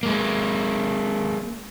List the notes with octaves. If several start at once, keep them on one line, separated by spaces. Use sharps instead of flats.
G#3 A#3